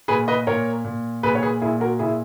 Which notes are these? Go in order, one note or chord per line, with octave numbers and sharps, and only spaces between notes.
A#2 G#4 B4
B4 D#5
A#2 A#4 C#5
A#2
A#2 G#4 B4
C#5
G#4 B4
A#2 E4 G#4
F#4 A#4
A#2 E4 G#4